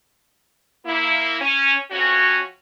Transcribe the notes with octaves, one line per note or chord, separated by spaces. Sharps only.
A#3 E4
C#4
F2 C#4 F#4